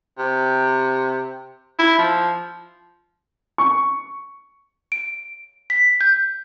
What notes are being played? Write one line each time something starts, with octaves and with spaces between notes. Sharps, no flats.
C3
E4
F3
C#6
D7
B6
G6